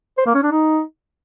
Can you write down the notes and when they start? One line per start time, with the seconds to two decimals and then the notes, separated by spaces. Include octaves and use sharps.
0.18 C5
0.26 A#3
0.35 C#4
0.43 D4
0.51 D#4